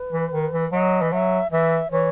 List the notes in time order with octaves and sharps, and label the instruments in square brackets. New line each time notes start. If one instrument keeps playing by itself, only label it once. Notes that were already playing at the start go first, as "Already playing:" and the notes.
Already playing: [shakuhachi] B4
[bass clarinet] E3
D#3
E3
[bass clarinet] F#3 [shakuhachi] D#5
[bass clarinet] E3
[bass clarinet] F#3 [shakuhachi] E5
[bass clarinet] E3 [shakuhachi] E5
[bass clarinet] E3 [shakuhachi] C#5